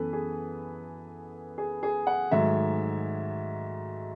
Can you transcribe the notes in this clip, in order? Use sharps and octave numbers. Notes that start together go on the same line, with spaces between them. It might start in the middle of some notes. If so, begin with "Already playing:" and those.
Already playing: F#2 E3 B3 A4 B4
G#4
G#4
G#4
F#5
G#2 D#3 F#3 A3 E5